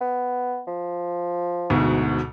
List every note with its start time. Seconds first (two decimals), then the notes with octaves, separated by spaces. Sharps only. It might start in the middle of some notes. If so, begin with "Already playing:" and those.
0.01 B3
0.67 F3
1.70 D2 G#2 B2